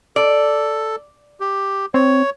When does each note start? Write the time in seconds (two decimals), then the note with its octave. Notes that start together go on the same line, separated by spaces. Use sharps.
0.16 A4 D5
1.40 G4
1.94 C4 C#5